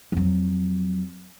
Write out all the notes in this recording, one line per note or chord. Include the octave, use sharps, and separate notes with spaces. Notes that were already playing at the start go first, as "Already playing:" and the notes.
F2 F#3